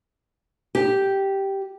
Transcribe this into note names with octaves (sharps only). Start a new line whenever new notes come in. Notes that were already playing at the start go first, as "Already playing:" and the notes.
G4